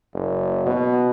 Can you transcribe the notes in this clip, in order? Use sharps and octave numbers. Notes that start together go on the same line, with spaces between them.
F#1
B2